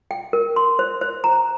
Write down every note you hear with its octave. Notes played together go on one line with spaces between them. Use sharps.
G5
A#4
C6
C5
C5
A#5